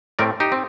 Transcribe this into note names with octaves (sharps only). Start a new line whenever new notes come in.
A2 A3 C4 A#4 D5
D#4 G4
C4